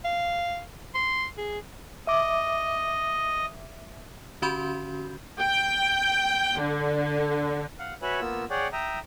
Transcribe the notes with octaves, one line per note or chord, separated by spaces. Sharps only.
F5
C6
G#4
D#5 E5 D6
D3 C#4 F#4 B5 C6 G6
G5
D3
F5 F#5
F#4 B4 C#5 E5 G#5 B5
A#3 B3 F4 E6
G#4 C#5 D5 F#5 G5
E5 G5 A#5 D#6